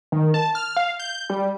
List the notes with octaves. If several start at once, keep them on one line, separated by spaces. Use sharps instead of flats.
D#3
A5
F6
F5
G6
G3